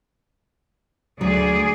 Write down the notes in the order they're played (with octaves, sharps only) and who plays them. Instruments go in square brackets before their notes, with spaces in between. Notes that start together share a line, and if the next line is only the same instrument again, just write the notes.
[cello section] D2 G#4 D5 [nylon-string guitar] F#3